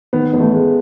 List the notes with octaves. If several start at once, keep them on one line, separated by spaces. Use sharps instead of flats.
D#3 B3
A1 B3
A3
G#3